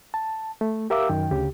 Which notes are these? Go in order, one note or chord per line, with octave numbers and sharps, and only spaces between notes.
A5
A3
G4 A#4 E5 F5 D6 E6
F#2 D#3 G5
D2 C#3 G4